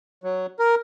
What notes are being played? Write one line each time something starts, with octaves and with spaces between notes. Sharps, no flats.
F#3
A#4